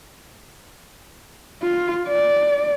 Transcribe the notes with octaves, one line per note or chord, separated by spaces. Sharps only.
F4
D5